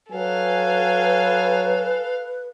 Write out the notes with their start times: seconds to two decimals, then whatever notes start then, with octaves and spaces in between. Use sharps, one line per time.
0.12 F#3 A4 B4 F5 G#5